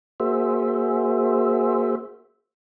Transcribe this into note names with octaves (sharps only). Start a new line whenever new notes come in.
A#3 F#4 G#4 C5 E5